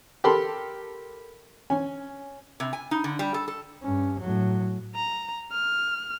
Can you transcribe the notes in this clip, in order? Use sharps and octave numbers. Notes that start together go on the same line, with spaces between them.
G4 A4 A#4 A5 B5 C6
C#4 G#5
C3
G#5
D#4
D3
G3
A4
A4
G2 C#4
A2 F#3
A#5
F6